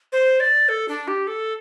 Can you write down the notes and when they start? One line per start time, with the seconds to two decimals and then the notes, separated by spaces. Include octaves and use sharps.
0.12 C5
0.40 D5
0.69 A4
0.88 D4
1.08 G4
1.27 A4